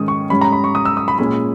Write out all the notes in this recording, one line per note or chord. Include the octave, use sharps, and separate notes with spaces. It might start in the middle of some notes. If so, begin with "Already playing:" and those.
Already playing: G#2 D#3 G#3 C#4 D#6
C#6
G#2 G3 C#4 B5
A#5
B5
C#6
D#6
E6
D#6
B5
A#2 G#3 C#4 B5